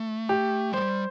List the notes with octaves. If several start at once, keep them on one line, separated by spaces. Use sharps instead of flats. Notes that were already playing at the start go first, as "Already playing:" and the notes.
Already playing: A3
G4
G3 C5